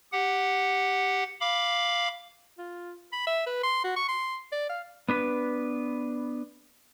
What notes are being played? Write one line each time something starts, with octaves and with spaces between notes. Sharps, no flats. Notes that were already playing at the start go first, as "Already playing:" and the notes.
G4 F#5
F5 B5 D6
F4
B5
E5
B4
C6
F#4
C#6
C6
D5
F5
B3 D4 B4